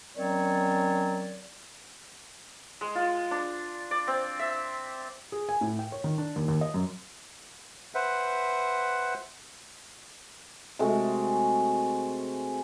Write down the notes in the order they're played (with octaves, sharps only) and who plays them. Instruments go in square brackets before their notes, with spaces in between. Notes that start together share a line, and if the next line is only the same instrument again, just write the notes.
[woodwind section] D#3 F#3 C4 C#4 C#5 D5
[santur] G#3
F4
D4
D5
C4
E5
[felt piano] G#4
G#5
A2
G5
C#5
D#3
D4
D#2
D#2
D#5
F#2
[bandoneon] B4 C5 E5 F#5
[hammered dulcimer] C3 G#3 A3 F#4